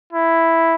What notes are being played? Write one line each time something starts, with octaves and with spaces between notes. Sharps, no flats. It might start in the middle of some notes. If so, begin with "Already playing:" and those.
E4